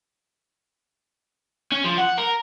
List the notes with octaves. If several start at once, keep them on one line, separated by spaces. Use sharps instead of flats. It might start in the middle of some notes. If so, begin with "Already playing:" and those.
C#4
F3
F#5
A#4